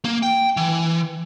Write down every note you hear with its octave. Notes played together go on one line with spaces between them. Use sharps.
A#3
G5
E3